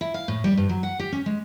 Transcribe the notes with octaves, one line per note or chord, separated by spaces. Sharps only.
E4
F5
A2
G3
G2
F#3
F#5
G4
C#4
G#3